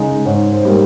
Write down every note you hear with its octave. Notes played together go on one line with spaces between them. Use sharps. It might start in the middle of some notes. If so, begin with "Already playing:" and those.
Already playing: C#3 G#3 D#4
G#2 C#5
C5
G3 A#3